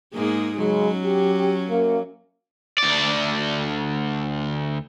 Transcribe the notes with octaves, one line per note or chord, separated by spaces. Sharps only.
G#2 A#3 G#4
C#3 F#3 G#3 C#4
G4
F#2 A#3
D2 D5